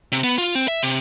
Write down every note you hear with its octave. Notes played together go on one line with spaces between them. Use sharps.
C3
B3
F4
C4
E5
C3